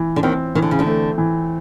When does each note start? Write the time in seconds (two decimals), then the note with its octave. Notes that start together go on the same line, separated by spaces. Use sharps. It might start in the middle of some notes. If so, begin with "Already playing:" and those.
Already playing: E3
0.16 D3
0.23 D#2 D#3 C4
0.55 D#3 E3
0.62 D3
0.71 C#3
0.79 D2 D3
0.86 A3
1.18 E3